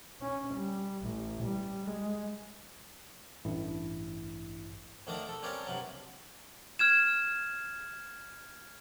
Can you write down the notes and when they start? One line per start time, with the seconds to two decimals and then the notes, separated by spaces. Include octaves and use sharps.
0.22 C#4
0.54 G3
1.05 A1
1.44 G3
1.85 G#3
3.45 A1 G2 E4
5.07 D2 D#3 D4 A#4 A#5 D6
5.29 A4
5.43 G3 C4 C#4 A#4 D5 F5
5.67 G2 C3 F#3
6.79 F6 G#6 E7